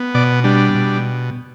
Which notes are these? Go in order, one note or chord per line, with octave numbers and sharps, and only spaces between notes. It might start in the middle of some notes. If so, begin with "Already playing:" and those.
Already playing: B3
B2 D5
G3 D4
B2